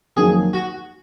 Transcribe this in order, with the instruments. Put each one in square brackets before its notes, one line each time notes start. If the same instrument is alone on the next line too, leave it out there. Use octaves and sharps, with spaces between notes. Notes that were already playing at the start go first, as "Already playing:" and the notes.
[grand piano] F2 D#3 F#3 A#3 [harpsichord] G#4
[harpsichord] F#4